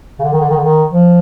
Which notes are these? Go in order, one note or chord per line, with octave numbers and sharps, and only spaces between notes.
C#3
D3
D#3
D3
D#3
D3
D#3
F3